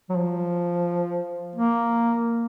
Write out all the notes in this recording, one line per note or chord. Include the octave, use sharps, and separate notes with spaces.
F#3
F3
A#3